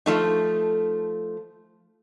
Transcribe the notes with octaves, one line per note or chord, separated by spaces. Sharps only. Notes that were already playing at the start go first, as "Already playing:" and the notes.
F3 A3 D#4